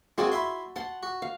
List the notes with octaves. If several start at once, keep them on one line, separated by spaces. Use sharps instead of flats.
G#3 A#3 C4 F#4 D5 G#5
E4 E5 C6
F#5 A5 C6
F#4
F5